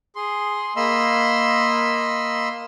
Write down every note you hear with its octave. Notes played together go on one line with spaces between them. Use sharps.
G#4 C6
A#3 D#5 B5 C6 E6